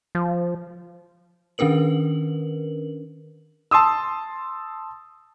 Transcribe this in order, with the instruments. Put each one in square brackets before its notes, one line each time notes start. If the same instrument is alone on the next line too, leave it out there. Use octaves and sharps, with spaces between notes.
[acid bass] F3
[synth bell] D#3 C#4 D4 A#4 B4 F#7
[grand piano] A5 C6 D#6 E6